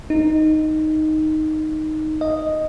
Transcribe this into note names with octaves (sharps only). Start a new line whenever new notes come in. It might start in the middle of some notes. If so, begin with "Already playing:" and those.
D#4
D#5